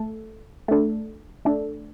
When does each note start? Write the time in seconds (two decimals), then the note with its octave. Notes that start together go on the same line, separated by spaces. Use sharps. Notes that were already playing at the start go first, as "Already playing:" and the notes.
Already playing: A3 A4
0.68 A3 D4 A4
1.45 A3 D4 A4